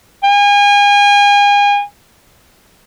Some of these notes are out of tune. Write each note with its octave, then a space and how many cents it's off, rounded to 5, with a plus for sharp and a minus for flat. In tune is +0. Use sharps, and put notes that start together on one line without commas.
G#5 -35